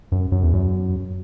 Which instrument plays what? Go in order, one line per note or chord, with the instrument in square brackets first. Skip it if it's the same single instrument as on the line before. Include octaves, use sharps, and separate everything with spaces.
[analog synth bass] F#2
F#2
E2
F#2